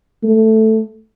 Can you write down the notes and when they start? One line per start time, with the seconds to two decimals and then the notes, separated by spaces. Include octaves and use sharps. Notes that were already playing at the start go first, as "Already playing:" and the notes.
0.23 A3